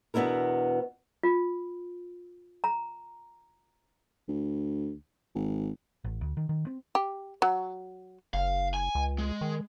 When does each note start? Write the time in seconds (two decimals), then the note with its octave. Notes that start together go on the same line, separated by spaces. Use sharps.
0.14 E2 B2 B3 D4 E4 A#4
1.23 F4
2.64 A#5
4.28 D2
5.35 G#1
6.04 A1
6.21 D2
6.37 D#3
6.49 D#3
6.67 C4
6.95 G4
7.42 F#3
8.34 F#1 F5
8.74 G#5
8.95 C#2
9.18 G#3
9.41 D#3